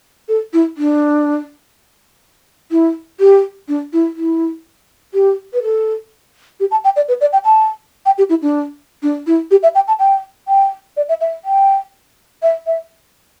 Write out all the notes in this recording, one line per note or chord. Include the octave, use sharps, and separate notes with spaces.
A4
E4
D4
E4
G4
D4
E4
E4
G4
B4
A4
G4
A5
G5
D5
B4
D5
G5
A5
G5
G4
E4
D4
D4
E4
G4
E5
G5
A5
G5
G5
D5
E5
E5
G5
E5
E5